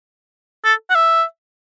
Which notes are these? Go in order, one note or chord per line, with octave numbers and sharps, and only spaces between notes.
A4
F#5
E5